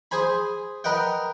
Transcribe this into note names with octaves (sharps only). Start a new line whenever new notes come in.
G#4 C5 G#5 B5
A#4 B4 D#5 F#5 G5